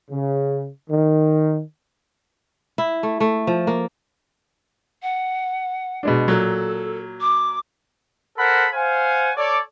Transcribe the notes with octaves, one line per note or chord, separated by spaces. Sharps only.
C#3
D#3
E4
A3
A3
F3
A#3
F#5
B2 G#3 D4
A#2 F#3 A4
D6
A4 A#4 C5 F#5 B5
C5 F5 F#5 G#5
A4 C#5 D5